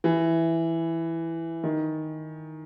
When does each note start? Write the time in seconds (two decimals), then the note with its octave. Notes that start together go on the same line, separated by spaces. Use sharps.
0.04 E3
1.64 D#3